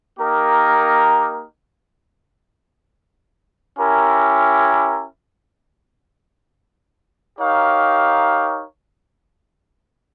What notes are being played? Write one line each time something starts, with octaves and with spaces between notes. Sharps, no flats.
A#3 D#4 G4 A#4
C#4 E4 G4 A#4
D#4 G4 A#4 C#5 F5